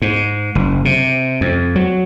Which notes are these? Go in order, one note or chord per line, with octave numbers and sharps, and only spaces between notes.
G#2
F#1
C3
F2
F#3